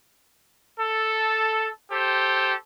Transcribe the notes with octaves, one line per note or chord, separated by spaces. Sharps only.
A4
G4 A4 C5